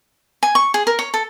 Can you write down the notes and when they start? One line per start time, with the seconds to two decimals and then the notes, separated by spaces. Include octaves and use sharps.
0.43 G#5
0.55 C#6
0.74 G#4
0.87 A#4
0.99 C#5
1.14 A4